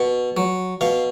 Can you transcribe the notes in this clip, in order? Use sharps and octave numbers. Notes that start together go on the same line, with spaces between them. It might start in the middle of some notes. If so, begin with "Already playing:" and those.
Already playing: B2
F#3
B2 F5